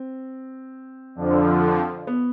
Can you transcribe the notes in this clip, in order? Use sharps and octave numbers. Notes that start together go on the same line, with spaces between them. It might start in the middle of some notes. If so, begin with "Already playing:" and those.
Already playing: C4
F2 D3 F3
B3